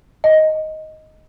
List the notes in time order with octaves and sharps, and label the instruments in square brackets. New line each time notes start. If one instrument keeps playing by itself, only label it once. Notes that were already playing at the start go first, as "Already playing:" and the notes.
[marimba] D#5